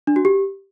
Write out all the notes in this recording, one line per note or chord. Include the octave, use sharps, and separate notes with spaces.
D4
F#4
G4